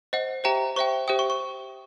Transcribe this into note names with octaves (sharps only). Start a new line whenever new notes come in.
C5 D#5 F#5
G4 C5 E5 G5 A#5
G4 C5 E5 G5 C#6
G4 C5 E5 G5 D#6
C#6
C#6